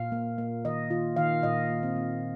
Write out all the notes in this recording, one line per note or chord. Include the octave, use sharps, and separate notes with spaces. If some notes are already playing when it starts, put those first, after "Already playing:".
Already playing: A#2 F5
A#3
A#3
D#3 D#5
D#3 F4
D#3 F5
A#2 D#5
A#3
C4
A#3